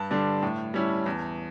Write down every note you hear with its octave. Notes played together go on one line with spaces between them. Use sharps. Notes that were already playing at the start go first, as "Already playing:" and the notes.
Already playing: G2 A5
D3 G3 D4
A2
G3 C#4 E4
E2